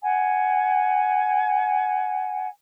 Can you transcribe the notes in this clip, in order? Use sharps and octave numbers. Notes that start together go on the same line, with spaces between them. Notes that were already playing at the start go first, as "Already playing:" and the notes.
F#5 G#5